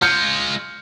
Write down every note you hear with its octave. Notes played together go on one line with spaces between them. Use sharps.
G#3 F4 F6 G6 C#7